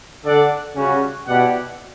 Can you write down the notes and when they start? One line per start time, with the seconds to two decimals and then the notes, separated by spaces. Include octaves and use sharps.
0.25 D3 D4 A4 D5 F#5
0.76 C#3 G3 C#4 F#4
1.27 B2 E4 G4 D5 F#5